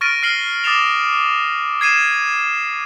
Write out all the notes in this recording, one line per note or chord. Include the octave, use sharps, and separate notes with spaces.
C#6 F6 A6 A#6 D7 D#7
F6 A#6 C7 F#7 G7
D6 D#6 A6 C7 E7 F7
G#6 C7 D#7 E7